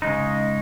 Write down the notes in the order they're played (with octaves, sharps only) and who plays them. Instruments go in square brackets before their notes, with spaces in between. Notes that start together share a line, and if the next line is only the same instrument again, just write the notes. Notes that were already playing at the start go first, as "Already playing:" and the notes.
[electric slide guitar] C#3 G#3 D#4